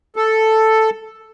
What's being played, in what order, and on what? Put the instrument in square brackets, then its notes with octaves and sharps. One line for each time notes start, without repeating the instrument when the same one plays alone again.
[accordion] A4